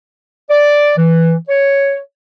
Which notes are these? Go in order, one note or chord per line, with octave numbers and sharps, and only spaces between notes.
D5
E3
C#5